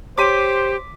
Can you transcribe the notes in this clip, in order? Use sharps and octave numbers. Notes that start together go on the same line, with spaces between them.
G4 C5 C#5 C6 D6 B6 D#7